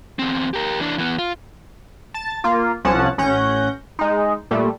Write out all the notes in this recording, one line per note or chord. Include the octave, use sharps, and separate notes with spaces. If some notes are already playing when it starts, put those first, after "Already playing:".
E2 C4
G4 A#4
E3 D4
E3 B3
F4
A5 A6
A#3 F4
C2 F3 C#4 F#5 A5
A1 C#4 F#5 G6 A#6
G#3 D#4
A#2 G3 A3